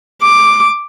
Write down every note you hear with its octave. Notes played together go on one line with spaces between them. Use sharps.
D6